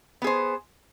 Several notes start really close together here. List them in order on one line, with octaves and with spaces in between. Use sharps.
B3 G#4 C5